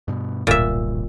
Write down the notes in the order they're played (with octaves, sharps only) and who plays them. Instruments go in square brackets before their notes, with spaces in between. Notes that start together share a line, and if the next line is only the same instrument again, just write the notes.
[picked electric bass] G2 B2
[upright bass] D1 [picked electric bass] B1 G2 [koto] A#2 E5